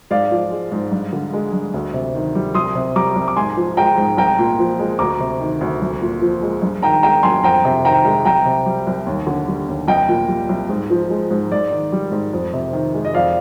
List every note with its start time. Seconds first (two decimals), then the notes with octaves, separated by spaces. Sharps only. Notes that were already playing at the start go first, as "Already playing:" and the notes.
0.11 G#2 D5 F5
0.31 F3
0.51 G#3
0.72 G#2
0.92 G2
1.13 D3
1.33 G#3
1.53 G2
1.74 D2
1.93 C3
2.15 D#3
2.35 G3
2.54 C2 C6 D#6
2.75 C3
2.95 G3 A#5 D6
3.16 C2
3.28 D6
3.36 G#2 G#5 C6
3.57 F3
3.77 G#3 G5 A#5
3.98 G#2
4.17 C2 G5 A#5
4.39 A#2
4.59 F3
4.79 G#3
4.99 D2 A#5 D6
5.20 C3
5.40 D#3
5.61 D2
5.81 C2
6.02 A#2
6.21 F3
6.43 G#3
6.62 G2
6.82 D#3 G5 A#5
7.03 G#3 G5 A#5
7.23 G2 G#5 C6
7.43 F2 G5 A#5
7.65 C3
7.85 D#3 G5 A#5
8.05 G#3
8.25 C2 G5 A#5
8.45 C3
8.66 G3
8.87 C2
9.06 D#2
9.27 D3
9.48 G3
9.68 D#2
9.88 C2 D#5 G5
10.09 A#2
10.28 G3
10.49 C2
10.69 G#2
10.90 F3
11.10 G#3
11.31 G#2
11.51 G#2 D5
11.71 D#3
11.92 G3
12.12 G#2
12.33 F2
12.53 C3
12.73 D#3
12.94 G#3
13.05 D#5
13.14 F2 D5 F5